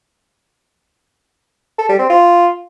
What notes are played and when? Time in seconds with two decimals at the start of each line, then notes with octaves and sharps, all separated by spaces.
1.78 A4
1.89 G3
1.99 C4
2.10 F4